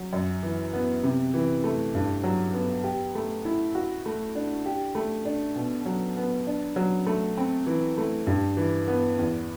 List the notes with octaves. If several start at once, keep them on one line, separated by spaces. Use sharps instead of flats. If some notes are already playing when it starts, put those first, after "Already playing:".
Already playing: F#3
F#2
E3
B3
C3
E3
A3
G2
F#3
B3
G4
A3
E4
F#4
A3
D4
G4
A3
D4
B2
F#3
B3
D4
F#3
A3
C4
E3
A3
G2
E3
B3
E2